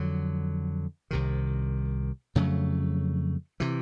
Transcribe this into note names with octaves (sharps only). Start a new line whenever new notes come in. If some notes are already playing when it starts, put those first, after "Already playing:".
Already playing: F2 D3 F#3
C2 C3 D#3
F2 C#3 F#3 A3
C3 E3